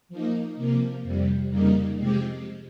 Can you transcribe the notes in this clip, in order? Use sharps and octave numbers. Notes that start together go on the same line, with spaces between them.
F3 A#3 D#4
C3 F3 A#3
F2 C3 G3
F2 C#3 G3 A#3 D#4
C3 F3 G#3 C4 G4